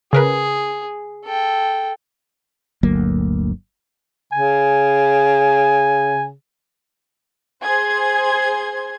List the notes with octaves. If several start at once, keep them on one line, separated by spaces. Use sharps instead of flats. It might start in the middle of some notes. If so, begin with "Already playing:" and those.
C#3 G#4 A#4 B4
A4 G5
G1 D2 F#3 A#3
C#3 G#5
G#4 C5 C6 G#6